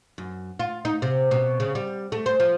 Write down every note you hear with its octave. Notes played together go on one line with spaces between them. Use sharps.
F#2
F4
D#4
C3
B2
C#3
G3
A3
C5
F3